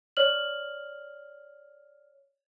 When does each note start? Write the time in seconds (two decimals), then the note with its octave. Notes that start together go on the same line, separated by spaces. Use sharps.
0.17 C#5 D5 F6 F#7